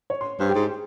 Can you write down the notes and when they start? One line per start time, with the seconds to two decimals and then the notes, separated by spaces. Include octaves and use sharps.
0.10 C#5
0.21 C6
0.40 G2 C5
0.49 G4
0.55 G#2
0.60 G#4